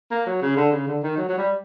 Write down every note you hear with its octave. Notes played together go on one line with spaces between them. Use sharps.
A#3
F#3
C#3
D3
C#3
D3
D#3
F#3
F#3
G3